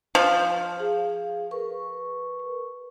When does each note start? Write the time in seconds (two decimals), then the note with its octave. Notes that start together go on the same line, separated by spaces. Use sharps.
0.15 F3
0.80 G#4 F5
1.51 A#4 B4 C#6